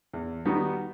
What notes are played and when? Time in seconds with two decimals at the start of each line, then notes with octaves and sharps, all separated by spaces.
0.13 E2
0.45 D#3 G3 B3 F#4